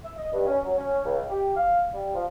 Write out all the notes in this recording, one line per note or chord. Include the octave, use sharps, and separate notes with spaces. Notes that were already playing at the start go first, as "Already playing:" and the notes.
E5
D#5
G2
C#4
F#3
C#4
C#2
G4
F5
G3
F3